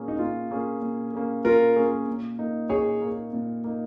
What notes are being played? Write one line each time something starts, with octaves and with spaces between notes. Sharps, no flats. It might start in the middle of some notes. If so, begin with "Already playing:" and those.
Already playing: A#2 A#3 C#4 G#4
D#4
A#2 F4
A#3 C#4 G#4
A#2
A#3 C#4 G#4
A#2 F4 A#4
A#3 C#4 G#4
A#2
A#3 D#4
A#2 G#4 C#5
A#3 D#4
A#2
A#3 D#4